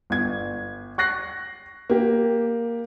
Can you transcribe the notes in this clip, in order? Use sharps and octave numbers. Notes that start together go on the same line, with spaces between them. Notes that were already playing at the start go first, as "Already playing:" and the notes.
G1 G#6
C#6 F#6 A#6 C7
A#3 G4